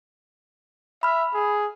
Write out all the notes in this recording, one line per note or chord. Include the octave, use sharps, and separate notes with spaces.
E5 B5 F6
G#4